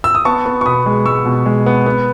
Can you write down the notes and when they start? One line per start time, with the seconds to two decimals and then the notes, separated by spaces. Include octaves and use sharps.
0.04 E6
0.15 D#6
0.25 B3 A5 C#6
0.46 B3
0.61 C#6
0.66 B2 B5 D#6
0.86 G#3
1.06 G#3 C#6 E6
1.26 B2
1.46 G#3
1.66 B3
1.86 B3